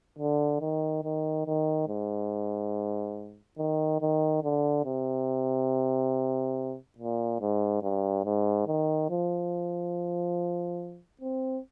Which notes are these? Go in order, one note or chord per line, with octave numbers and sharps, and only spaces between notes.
D3
D#3
D#3
D#3
G#2
D#3
D#3
D3
C3
A#2
G#2
G2
G#2
D#3
F3
C4